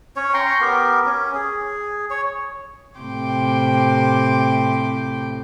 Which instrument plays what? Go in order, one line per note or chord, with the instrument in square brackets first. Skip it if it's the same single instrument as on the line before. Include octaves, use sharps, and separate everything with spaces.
[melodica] C#4 C#5
G5 A#5 C6 C#6
B3 G4 A#4
C#4
G#4
C#5
[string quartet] A2 C3 G5 C6 D6